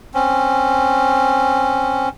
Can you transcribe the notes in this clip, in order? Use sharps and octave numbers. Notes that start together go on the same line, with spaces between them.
C4 C#4